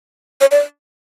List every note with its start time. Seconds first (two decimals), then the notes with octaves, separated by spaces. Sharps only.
0.41 C#5
0.51 D5